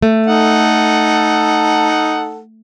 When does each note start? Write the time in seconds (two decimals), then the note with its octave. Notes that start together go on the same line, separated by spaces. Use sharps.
0.02 A3
0.26 D#4 A4 F#5